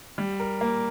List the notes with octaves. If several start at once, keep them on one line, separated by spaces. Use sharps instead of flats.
G3
A#4
A#3